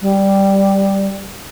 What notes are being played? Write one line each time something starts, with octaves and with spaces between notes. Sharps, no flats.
G3